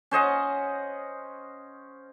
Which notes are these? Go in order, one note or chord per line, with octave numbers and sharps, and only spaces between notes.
C#4 C5 D#5 F#5